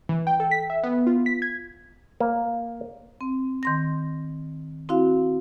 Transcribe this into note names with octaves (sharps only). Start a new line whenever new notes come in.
E3
G5
A4
B6
E5
B3
F4
B6
G#6
A#3
C4
D#3 C6 A#6
C4 E4 F#4 F5